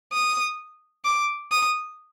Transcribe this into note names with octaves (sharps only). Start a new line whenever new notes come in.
D#6
D6
D#6